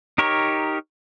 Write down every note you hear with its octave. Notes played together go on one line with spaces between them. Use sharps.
D#4 G4 A#4 C#5